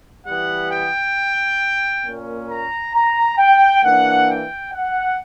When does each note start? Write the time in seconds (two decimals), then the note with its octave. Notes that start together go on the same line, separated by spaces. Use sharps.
0.24 E3 G3 B3 F#5
0.70 G5
2.04 A#2 A#3 C#4
2.48 A#5
2.93 A#5
3.38 G5
3.83 E3 A#3 D4 F#5
4.28 G5
4.72 F#5